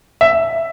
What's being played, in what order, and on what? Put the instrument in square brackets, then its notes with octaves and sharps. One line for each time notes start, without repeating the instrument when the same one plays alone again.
[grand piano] E5